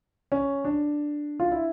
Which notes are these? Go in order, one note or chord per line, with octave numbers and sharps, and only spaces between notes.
C#4
D4
F4
E4